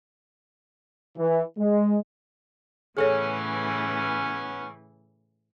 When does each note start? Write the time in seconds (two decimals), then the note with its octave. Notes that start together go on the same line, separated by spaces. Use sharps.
1.18 E3
1.58 G#3
2.97 A2 C#3 E3 B3 C#4 G#4 A4 C#5